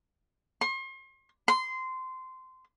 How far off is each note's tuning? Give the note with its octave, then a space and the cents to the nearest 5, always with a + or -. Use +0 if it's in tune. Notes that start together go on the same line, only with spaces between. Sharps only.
C6 +40
C6 -15